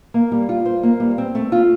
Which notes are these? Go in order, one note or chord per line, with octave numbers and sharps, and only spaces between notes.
A#3
G3
F4
C5
A#3
G3
C4
A3
F4